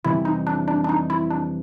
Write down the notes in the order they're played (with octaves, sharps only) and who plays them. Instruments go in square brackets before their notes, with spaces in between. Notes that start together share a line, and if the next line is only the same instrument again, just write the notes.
[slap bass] F2 C3 E3 G3 [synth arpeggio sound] E4
[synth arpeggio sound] D#4
D4
D4
D4
D#4
E4
D4